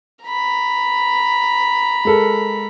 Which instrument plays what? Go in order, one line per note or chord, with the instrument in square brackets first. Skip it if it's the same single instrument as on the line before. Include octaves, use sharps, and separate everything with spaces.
[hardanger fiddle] A#5 B5
[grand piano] G#3 A4 A#4